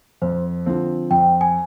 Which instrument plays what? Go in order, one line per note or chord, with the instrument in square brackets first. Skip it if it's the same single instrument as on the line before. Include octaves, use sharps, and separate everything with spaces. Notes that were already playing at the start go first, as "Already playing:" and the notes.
[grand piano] F2 [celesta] C5
[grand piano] D3 F3 C4
[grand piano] F2 [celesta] G5
[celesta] G#5